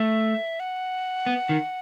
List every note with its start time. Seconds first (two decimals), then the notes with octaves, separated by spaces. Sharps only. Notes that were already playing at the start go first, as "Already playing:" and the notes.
Already playing: A3 E5
0.60 F#5
1.26 B3
1.49 D#3